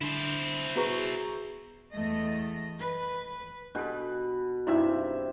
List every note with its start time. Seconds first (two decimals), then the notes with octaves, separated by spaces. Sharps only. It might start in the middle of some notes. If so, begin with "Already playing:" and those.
0.01 D3 E4 C5
0.76 B3 F#4 G#4 B4 A#5 C#6
1.91 E2 A3 D#5
2.80 B4
3.75 B2 D4 G4 A4 B4
4.67 G2 C3 D#4 E4 E5